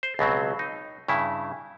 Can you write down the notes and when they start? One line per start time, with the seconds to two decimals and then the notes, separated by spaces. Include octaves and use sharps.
0.03 C5
0.19 C#2 B2 F#3 C4
0.59 D#4
1.08 G2 C#3 E4